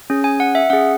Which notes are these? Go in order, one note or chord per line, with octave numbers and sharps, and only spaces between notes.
C#4 G#4
G#5
F#5
E5
C#4 G#4 F#5